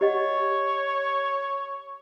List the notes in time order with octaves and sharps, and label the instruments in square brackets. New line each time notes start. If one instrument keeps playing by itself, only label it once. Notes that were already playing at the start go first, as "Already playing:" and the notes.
[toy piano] G4 D#5 F#5 [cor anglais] C#5